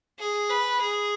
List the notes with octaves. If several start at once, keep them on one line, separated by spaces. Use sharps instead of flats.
G#4
B4
G#4